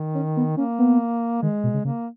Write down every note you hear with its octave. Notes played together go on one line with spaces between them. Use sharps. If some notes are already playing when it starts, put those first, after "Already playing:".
Already playing: D#3
C#4
B3
A#3 C#4
B3
D#3 G#3
B2
C#3
C#3 A#3